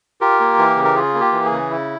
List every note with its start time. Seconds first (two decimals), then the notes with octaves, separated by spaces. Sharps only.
0.21 F4 G4 A#4
0.40 A#3
0.58 E3
0.76 C#3
0.84 A#4
0.95 F4 G#4
1.14 A#3
1.20 G4
1.32 E3
1.46 G#4
1.52 C#3
1.71 E4